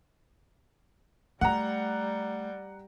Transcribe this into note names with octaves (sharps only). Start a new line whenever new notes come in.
G3 A3 F#5 A#5